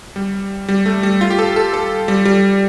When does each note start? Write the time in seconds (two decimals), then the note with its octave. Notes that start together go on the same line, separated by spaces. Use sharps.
0.16 G3
0.68 G3
0.86 A3
1.03 G3
1.21 F4
1.30 G4
1.39 A4
1.56 A4
1.74 A4
2.08 G3
2.25 G3